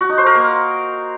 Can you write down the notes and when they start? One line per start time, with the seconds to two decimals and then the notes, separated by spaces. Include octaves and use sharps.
0.01 F#4
0.09 D#4
0.18 C5
0.26 A#4
0.35 A#3